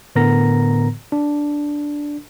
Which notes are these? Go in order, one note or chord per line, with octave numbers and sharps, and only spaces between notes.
A2 D3 B3 A#4 A#5 A#6
D4